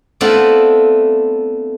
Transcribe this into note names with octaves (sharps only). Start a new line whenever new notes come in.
A3 B3 C4 D4 E4 F4